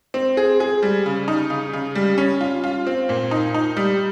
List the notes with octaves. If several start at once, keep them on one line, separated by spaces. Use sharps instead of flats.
C4
G#4
G#4
G3
C#3
D#4
C#3
C#3
G3
C#4
F4
F4
C4
A#2
D#4
D#4
G3